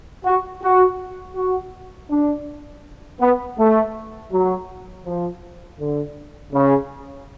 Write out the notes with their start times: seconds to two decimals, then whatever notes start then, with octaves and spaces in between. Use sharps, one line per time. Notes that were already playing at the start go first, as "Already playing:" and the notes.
0.25 F#4
0.63 F#4
1.36 F#4
2.10 D4
3.20 B3
3.58 A3
4.32 F#3
5.05 F3
5.80 D3
6.53 C#3